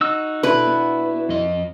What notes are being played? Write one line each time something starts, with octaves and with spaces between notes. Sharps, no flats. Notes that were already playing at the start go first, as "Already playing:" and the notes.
D#4 F#4 E6
B2 D4 E4 B4
B3
F2 D#5